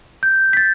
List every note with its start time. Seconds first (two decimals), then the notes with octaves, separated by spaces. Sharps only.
0.23 G6
0.53 B6
0.57 A6